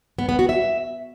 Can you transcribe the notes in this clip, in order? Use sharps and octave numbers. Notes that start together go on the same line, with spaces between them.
B3
B3
F#4
E5